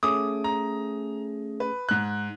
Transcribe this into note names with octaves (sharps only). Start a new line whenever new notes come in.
A3 C#4 G#4 D6 D#6
A#5
B4
G#2 F#6